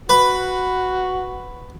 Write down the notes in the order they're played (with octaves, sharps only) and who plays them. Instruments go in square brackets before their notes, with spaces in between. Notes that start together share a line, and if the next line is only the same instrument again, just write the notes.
[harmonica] F#4 [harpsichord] B4